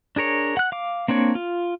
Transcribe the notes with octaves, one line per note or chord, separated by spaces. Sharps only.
D4 G#4 A#4 C#5
F#5 F#6
F5 D6
A#3 C4 D4 C#5
F4